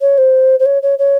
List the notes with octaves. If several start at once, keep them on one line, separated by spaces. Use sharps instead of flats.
C#5
C5
C5
C#5
C#5
C#5